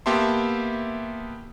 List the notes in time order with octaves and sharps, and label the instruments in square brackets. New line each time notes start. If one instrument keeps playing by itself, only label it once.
[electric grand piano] A#3 B3 G4 E5 A5 C6